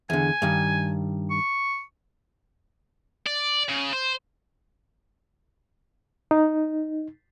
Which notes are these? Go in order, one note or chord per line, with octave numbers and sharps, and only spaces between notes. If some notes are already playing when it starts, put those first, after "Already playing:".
E2 D3 G#5
G2 D#3
C#6
D5
C#3
C5
D#4